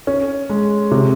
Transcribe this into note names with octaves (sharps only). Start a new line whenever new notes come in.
C#4
G#3
C3